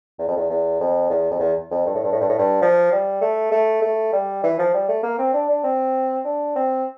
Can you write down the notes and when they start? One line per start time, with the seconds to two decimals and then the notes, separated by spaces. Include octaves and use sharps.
0.19 E2
0.28 F2
0.36 E2
0.50 E2
0.80 F2
1.10 E2
1.31 F2
1.39 E2
1.71 F2
1.86 G2
1.95 A2
2.04 G2
2.12 A2
2.21 G2
2.29 A2
2.38 G2
2.62 F3
2.92 G3
3.21 A3
3.52 A3
3.82 A3
4.13 G3
4.44 E3
4.59 F3
4.74 G3
4.89 A3
5.03 A#3
5.18 C4
5.33 D4
5.49 D4
5.64 C4
6.25 D4
6.56 C4